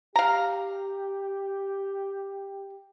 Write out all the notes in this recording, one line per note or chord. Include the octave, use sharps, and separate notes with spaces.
G4 F5 A#5